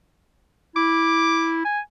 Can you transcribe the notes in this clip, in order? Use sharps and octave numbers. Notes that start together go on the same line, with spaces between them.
E4 D6
G#5